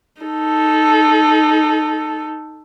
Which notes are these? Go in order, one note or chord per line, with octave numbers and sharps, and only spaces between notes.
D#4 A4